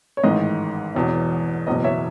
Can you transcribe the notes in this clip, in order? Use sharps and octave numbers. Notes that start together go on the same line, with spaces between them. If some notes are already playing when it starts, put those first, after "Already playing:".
C#5
A1 G#2 D#3 D#5
E1 E2 B2
F#1 E2 B2 D#5
C#5 E5